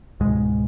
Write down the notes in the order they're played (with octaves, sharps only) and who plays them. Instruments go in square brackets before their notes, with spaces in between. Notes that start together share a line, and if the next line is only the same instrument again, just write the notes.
[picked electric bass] C#2 G#2 B2 G#3